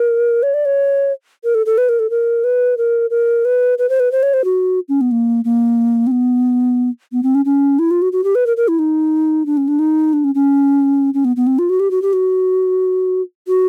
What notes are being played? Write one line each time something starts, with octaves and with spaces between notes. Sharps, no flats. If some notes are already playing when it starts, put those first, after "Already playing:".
Already playing: A#4
C#5
D5
C#5
A#4
A4
A4
B4
A#4
A4
A#4
B4
A#4
A#4
B4
B4
C5
B4
C5
C#5
C5
F#4
C#4
B3
A#3
A#3
C4
B3
B3
C4
C#4
C#4
E4
F4
F#4
F#4
G4
B4
A#4
A#4
E4
D#4
D4
C#4
D4
D#4
D4
C#4
C#4
C#4
B3
B3
C4
F4
F#4
G4
F#4
G4
F#4
F#4